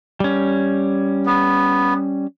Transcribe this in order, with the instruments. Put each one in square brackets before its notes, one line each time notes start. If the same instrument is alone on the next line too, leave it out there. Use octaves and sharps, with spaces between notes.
[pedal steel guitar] G3 C#4
[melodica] B3